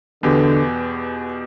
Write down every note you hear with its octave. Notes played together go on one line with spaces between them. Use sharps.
E2 B2 D3 B3 G4